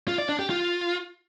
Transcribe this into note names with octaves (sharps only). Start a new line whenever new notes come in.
F4
D5
D4
G4
F4